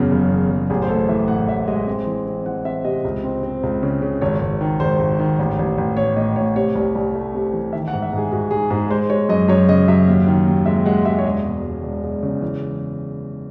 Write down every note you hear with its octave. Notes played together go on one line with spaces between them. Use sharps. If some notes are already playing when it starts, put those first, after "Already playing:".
Already playing: F#1 E2 C#3 F#4
F#1
E2
F#1
A1 G#4
C5
A2 A4
E3 E5
A2 F#5
A1 E5
G#3 D#5
C4
E3
C4
E3 F#5
C4 E5
C3 D#5
C#2
C4
C4
C#2
C#3
C#3
G#1 C#5
G#1
D#3
G#1 C5
G#1
D#3
A1
A1
A1
A2 C#5
A2 D#5
A2 C#5
C3 C#5
C2
C2
A3
C3
E3
D#3 E5
F#5
G#2
E5
G#2 G#4
G#2 F#4
G#2 G#4
G#2 G#4
G#3 C5
G#3 C#5
F#2 D#5
F#2 C#5
C#3 D#5
F#2 E5
D#2
D#3
D#2
G#3 E5
G#3 F#5
G#3 E5
C#5
E1 D#5
E1
E1
E1
E1
C#3
E3